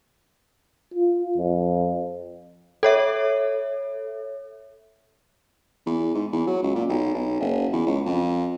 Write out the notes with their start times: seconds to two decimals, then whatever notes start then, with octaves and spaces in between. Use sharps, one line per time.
0.94 F4
1.38 F2
2.83 A4 C#5 E5
5.86 E2
6.14 G#2
6.33 E2
6.47 F#3
6.63 C#2
6.75 A#2
6.89 B1
7.15 B1
7.40 F#1
7.73 E2
7.87 C#2
8.06 F2